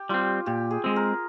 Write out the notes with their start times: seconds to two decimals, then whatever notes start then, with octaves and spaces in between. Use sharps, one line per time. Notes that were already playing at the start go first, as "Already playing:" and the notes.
Already playing: G4
0.09 G3 C4 F4
0.46 A#2 G4
0.71 G#4
0.84 G#3 C4
0.96 A#4